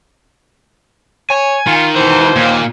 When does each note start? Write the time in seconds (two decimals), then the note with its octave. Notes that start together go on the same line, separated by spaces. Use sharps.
1.30 C#5 G#5
1.67 D#3 F4
1.96 B2 E3 C5
2.36 D#2 A#2 A#3